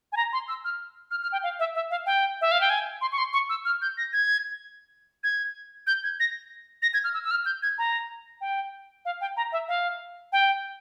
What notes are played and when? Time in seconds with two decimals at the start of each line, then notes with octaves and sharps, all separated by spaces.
0.12 G#5
0.17 A#5
0.33 C6
0.48 E6
0.65 F6
1.11 F6
1.22 F6
1.32 G5
1.43 F5
1.59 E5
1.75 E5
1.91 F5
2.06 G5
2.41 E5
2.51 F5
2.61 G5
2.70 G#5
3.01 C6
3.12 C#6
3.18 C6
3.33 C#6
3.49 E6
3.65 F6
3.82 G6
3.98 A#6
4.13 G#6
5.24 G#6
5.87 G6
6.03 G#6
6.20 A#6
6.82 A#6
6.94 G#6
7.04 F6
7.14 E6
7.24 E6
7.31 F6
7.46 G6
7.62 G#6
7.78 A#5
8.41 G5
9.05 F5
9.21 G5
9.37 A#5
9.52 E5
9.68 F5
10.32 G5